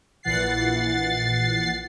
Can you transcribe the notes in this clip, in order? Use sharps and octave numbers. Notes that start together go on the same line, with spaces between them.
A#1 A#2 E3 F#5 A6 C7